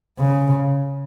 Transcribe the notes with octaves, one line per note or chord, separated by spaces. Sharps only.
C#3